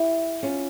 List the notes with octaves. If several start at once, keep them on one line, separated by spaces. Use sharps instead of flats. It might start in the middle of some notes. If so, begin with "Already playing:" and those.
Already playing: E4 G4
C#4 F4